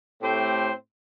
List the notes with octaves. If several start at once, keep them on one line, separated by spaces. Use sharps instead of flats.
A2 A3 C4 G4 C5